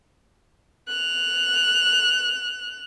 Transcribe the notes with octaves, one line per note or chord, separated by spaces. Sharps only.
F#6 F7